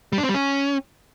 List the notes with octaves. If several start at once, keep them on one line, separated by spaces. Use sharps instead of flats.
G3
D4
C4
G3
C#4